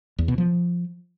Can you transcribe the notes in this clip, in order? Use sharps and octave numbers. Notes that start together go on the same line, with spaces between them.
E2
B2
F3